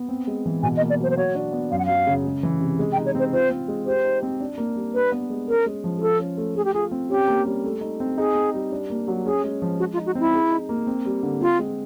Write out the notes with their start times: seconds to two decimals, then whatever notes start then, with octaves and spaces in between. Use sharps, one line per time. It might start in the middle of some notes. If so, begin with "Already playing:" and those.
Already playing: B3
0.09 C4
0.27 G#3
0.46 E3
0.63 B2 G#5
0.77 D#5
0.80 A#3
0.90 D5
0.99 F#3 C5
1.10 C5
1.17 F#4 C#5
1.35 D4
1.53 B3
1.71 F#2 F5
1.79 F#5
1.86 F#3 F5
2.07 C#3
2.25 G#3
2.43 E3
2.61 C3
2.79 G#3
2.92 G5
2.96 D#4
3.06 C#5
3.15 C4 C5
3.33 F4 C5
3.50 C4
3.68 G#3
3.86 G4 C5
4.04 D#4
4.23 C4
4.40 D4
4.58 A#3
4.76 G3
4.94 D4 B4
5.12 B3
5.30 G#3
5.48 C#4 A#4
5.66 G#3
5.84 F3
5.98 G#4
6.01 F4 A4
6.19 C#4
6.37 A3
6.55 A3 G#4
6.65 G4
6.74 F4 G#4
6.91 C4
7.10 C#4 G4
7.28 A#3
7.45 G3
7.64 A3
7.81 D#4
8.00 C4
8.17 D#4 G#4
8.35 C4
8.54 G3
8.72 D4
8.90 A#3
9.08 F#3
9.25 C#4 G#4
9.44 G#3
9.62 F3
9.79 G#3 F#4
9.93 F4
9.97 D#4
10.06 F#4
10.15 C4 E4
10.33 G#4
10.51 D#4
10.69 A#3
10.87 C4
11.05 G3
11.23 D3
11.41 C4 F4
11.59 G#3